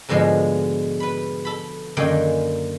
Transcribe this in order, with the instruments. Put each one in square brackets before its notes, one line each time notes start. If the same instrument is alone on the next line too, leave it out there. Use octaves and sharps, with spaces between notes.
[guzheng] G#2 B2 D3 F3 G#3
B4 B5
A4 B5
F#2 D3 D#3 A#3 G5 G#5